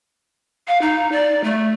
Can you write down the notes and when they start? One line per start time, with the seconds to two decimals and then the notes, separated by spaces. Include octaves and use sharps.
0.68 F5
0.82 D#4
1.12 D5
1.44 A3